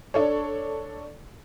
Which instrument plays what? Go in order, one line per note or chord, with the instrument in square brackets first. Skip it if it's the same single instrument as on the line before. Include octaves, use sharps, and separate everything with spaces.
[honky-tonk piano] D4 A4 C#5